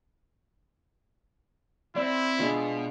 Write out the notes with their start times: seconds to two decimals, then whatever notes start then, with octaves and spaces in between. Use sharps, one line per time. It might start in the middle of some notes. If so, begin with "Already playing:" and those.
1.96 C4 E4 D5
2.39 B2 G#3 D4 F4